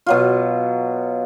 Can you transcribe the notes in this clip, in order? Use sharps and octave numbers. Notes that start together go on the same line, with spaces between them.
B2 F#3 F4